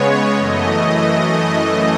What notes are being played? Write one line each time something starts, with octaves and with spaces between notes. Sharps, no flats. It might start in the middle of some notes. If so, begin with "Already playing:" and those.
Already playing: C#3 G#3 B3 C#5
F#2 E3 A3 D#5